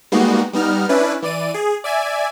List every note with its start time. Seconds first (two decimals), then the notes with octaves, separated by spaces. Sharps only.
0.12 G3 G#3 A#3 B3 D#4 F#4
0.53 G3 B3 D#4 F6
0.89 C#4 D4 E4 B4
1.22 E3 D5 D#7
1.54 G#4
1.84 D5 E5 G#5